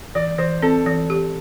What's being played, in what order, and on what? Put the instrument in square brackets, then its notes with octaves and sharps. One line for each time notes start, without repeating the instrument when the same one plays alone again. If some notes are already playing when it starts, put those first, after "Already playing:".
[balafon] E3 [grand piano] D5
[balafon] E3 [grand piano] C5
[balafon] C4 [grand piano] A4
[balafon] E3
G4